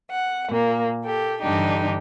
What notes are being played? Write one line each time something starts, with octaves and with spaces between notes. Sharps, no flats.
F#5
A#2 A#3
G4 A4
G2 D3 E3 D4 D#4 G4